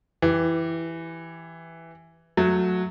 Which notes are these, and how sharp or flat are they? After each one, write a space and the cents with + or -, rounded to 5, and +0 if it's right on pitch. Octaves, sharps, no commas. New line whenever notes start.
E3 +5 G4 +0
F#3 -15 A3 +0